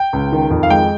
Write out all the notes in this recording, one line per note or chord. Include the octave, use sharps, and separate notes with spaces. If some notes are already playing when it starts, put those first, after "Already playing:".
Already playing: G5
C#2
D#3
F2
F5
G#3 G5